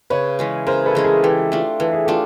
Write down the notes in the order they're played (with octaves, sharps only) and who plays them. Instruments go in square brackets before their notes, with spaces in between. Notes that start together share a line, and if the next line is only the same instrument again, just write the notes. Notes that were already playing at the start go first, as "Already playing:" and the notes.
[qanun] C#3 [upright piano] B4 C#5
[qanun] E3 G#3 C#4
[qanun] C#3 [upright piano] A#4 C5
[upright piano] A4 B4
[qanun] E3 G#3 C#4
[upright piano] G#4 A#4
[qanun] E3 [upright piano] G4 A4
[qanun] A3 D4 F4
[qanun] E3 [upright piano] A4
[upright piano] G#4
[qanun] A3 D4 F4 [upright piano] G4 A4